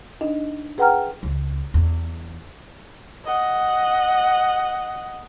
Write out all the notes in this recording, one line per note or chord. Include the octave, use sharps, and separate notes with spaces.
D4 D#4 D#5
G#4 B4 F#5 G5 A#5 F6
C#2
E2
D#5 F#5